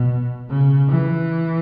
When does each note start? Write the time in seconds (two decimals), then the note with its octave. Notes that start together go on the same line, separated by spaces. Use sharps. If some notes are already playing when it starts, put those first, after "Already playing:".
Already playing: B2
0.50 C#3
0.89 E3